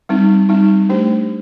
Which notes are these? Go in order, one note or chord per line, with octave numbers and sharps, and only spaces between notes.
G3 C4 D#4
G3 C4 D#4
A3 D4 G4 C5